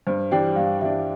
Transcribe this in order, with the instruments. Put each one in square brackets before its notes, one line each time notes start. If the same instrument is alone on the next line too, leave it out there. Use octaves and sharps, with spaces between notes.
[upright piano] G2 [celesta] C5
[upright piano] E3 G3 D4 [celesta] G5
[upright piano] G2 [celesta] F5
[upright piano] E3 G3 D4 [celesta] E5